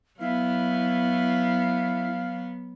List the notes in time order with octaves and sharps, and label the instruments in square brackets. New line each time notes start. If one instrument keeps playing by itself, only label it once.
[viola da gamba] F#3 B3 [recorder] E4 [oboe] F5